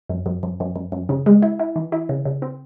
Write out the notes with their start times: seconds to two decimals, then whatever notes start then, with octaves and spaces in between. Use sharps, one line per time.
0.10 F#2
0.26 F#2
0.43 F#2
0.60 F#2
0.76 F#2
0.92 F#2
1.09 C#3
1.26 G#3
1.42 E4
1.60 E4
1.76 E3
1.92 E4
2.09 C#3
2.25 C#3
2.42 C4